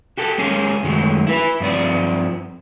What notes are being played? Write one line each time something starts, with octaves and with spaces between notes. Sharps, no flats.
F#4 G4 A4
G#3 A#3 C#4 G#4
F#2 D#3 F#3 G#3 A3
E4 B4
G2 F3 C4 D5